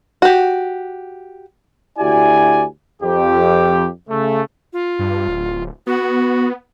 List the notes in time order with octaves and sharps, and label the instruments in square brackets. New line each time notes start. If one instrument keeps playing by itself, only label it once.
[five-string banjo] F#4 G4
[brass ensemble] D2 E4 F#4 G4 D5 G#5
F2 G4
C#3 A3
[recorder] F4
[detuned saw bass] G2
D1
[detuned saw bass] B3 [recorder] F#4